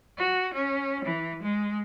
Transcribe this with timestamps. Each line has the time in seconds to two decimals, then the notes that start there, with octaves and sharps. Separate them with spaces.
0.18 F#4
0.54 C#4
1.04 E3
1.42 G#3